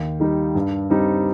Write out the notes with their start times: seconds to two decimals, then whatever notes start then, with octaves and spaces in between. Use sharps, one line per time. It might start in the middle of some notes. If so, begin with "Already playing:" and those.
Already playing: D#2
0.20 D#3 G3 D#4
0.55 G2
0.90 G3 C4 D#4